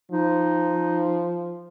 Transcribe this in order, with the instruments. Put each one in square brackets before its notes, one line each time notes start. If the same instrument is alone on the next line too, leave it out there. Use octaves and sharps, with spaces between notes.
[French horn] F3 [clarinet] D#4